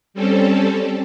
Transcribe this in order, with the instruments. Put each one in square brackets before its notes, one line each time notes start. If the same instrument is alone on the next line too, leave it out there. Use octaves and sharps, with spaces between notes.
[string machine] G3 C4 C#4 A4